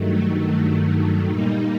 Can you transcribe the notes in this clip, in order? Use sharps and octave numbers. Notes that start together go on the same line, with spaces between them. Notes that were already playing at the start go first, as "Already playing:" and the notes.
Already playing: G2 D#3 F#3 A3
A#2 G3 A#3 D#4